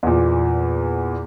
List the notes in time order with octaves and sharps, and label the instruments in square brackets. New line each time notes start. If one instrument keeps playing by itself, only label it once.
[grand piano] E2 A#2